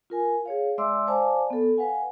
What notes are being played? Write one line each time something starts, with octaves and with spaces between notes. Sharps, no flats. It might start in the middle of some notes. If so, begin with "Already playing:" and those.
F4 A#4 G#5
G#4 C#5 F5
G#3 D5 E5 C6 D6 E6
C5 D5 F5 G#5 A5 D6
B3 A4
B4 F5 F#5 G#5